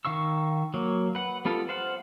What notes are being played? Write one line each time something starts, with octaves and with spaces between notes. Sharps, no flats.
D#3 F5 C#6 E6
F#3 A#3
B4 F#5
G3 B3 F4 A4
C5 F5 F#5